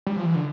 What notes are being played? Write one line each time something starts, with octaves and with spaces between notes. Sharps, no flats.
G3
F3
E3
D3